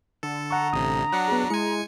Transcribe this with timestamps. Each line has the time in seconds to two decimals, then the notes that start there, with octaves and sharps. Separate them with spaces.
0.23 D3 A4
0.51 F#5 A#5 C#6
0.73 A1 C3 D#6
1.13 F#3 D4 F#5
1.28 B3 G#4
1.50 G#3 E4 G#5 C#7